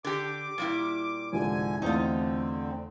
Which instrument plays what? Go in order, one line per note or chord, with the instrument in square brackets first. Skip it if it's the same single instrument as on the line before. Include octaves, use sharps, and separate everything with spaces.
[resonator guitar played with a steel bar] D3 G4 [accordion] D6
[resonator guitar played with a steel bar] A#2 G3 E4
[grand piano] C2 G#2 F3 [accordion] D3 G#5
[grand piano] E2 A3 [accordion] D3 C4 [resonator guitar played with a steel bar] D#4 F4